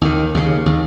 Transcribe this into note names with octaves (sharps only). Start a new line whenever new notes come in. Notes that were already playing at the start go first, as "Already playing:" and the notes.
D#2 D#3
D#2 C#3
D#2 D#3